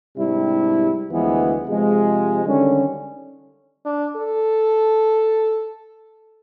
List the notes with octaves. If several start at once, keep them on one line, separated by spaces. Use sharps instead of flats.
G#2 C3 G3 D4 E4
D2 E3 F3 G#3 B3
C3 F3 G#3
D3 D#3 G3 C#4
D4
A4